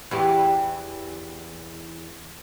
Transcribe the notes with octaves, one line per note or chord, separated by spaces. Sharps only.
E2 E3 G4